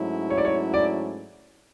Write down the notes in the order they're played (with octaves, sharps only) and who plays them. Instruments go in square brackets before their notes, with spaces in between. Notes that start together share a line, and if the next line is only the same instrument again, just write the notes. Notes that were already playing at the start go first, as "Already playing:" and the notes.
Already playing: [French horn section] G#2 F#3 A3 C#4 E4
[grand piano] C#5
D5
C#5
D5